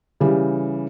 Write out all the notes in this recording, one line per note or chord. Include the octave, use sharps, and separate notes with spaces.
C#3 E3 G3